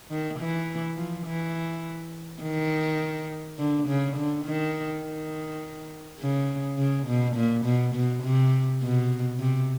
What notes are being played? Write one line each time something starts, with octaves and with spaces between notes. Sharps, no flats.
D#3
E3
F3
E3
D#3
D3
C#3
D3
D#3
D#3
C#3
C#3
B2
A#2
B2
B2
C3
B2
C3